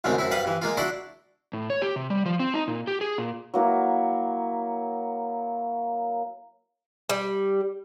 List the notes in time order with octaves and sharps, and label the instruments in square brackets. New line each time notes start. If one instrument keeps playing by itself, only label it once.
[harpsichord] C2 F#2 D3 G#3 A3 C4
F#2 C4 E4
G2 G3 B4 F5 F#5
G2 E3
G#3 A#3 F4
D4 E4 F#4 D5 F#5 C6
[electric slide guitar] A2
C#5
G4
C3
G3
F3
C4
D#4
A#2
G4
G#4
A#2
[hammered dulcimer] F#3 A#3 E4
[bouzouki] G3